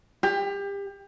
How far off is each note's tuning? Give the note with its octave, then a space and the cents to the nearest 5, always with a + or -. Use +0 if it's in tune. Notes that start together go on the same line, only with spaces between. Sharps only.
G4 +30